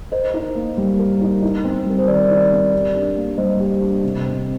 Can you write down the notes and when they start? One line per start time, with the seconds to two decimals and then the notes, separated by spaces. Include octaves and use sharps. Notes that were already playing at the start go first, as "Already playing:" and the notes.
0.12 A#4 C5 D#5
0.34 D#4
0.55 A#3
0.77 G3
0.99 A#4
1.21 D#4
1.42 D#4
1.64 C4
1.86 G3 A#4
1.98 C5
2.08 D#3 A#4 D5
2.29 D#4
2.51 C4
2.73 G4
2.95 D4
3.16 A#3
3.38 G3 C5 D#5
3.60 G4
3.82 D4
4.04 C3
4.26 C4